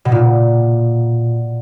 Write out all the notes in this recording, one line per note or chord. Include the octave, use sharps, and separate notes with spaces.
B2
A#2